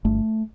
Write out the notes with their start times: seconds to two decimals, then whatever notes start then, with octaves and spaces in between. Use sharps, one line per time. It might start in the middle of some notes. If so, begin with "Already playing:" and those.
0.05 G1 A3